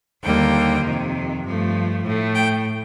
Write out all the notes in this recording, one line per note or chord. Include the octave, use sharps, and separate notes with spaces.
D#2 D3 G3 A#3 G5
F2 C3 D#3
G2 F3 A3
A2 A3
G5